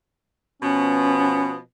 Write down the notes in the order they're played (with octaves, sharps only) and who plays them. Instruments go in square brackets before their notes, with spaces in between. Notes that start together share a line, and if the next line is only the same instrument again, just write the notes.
[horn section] B2 F3 B3 [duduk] C#4